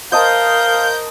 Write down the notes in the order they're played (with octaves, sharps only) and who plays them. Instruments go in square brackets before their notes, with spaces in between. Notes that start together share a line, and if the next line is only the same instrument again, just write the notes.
[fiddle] A#4 [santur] C5 D#5 A5 [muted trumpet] F5 [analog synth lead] G6